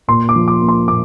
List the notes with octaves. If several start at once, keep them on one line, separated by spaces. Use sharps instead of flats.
A#2 C6
D6
F3
D6
A#3
C6
A#2 D6